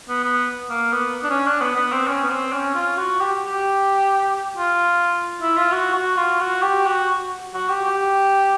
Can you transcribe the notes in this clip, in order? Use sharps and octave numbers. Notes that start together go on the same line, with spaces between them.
B3
B3
A#3
B3
D4
C#4
D4
B3
B3
C4
C#4
B3
C4
C#4
F4
F#4
G4
G4
F4
E4
F4
F#4
F#4
F4
F#4
G4
F#4
F#4
G4
G4